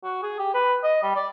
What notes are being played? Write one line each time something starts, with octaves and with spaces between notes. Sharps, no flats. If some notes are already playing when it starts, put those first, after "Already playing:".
F#4
G#4
G4
B4
D#5
G3
D5